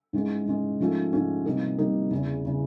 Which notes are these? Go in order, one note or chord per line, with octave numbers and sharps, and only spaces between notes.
G#2 E3 G#3 C#4
G#2 E3 G#3 C#4
G#2 F3 A3 C#4 F4
G#2 F3 A3 C#4 F4
C3 E3 G3 A#3 D#4
C3 E3 G3 A#3 D#4
E2 C#3 E3
C#3 E3